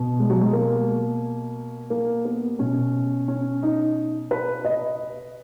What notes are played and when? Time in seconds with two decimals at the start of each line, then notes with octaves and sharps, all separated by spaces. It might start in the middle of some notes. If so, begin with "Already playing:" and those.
Already playing: B2
0.19 G#3
0.30 F#3
0.41 G#3
0.53 A#3
1.90 A#3
2.25 B3
2.59 B2 C#4
3.28 C#4
3.63 D#4
4.31 B4
4.65 D#5